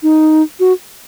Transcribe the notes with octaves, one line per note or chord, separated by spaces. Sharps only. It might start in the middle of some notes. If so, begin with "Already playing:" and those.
D#4
F#4